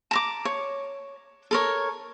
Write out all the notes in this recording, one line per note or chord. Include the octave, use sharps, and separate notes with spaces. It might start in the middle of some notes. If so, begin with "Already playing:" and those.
A5 A#5 D6
C#5
A4 A#4 C#5